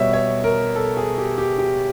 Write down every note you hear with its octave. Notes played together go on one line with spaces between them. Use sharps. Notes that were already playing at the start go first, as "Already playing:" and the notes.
Already playing: B2 G3 C#5 E5
C#5
A#4
A4
G#4
G4
G4
G4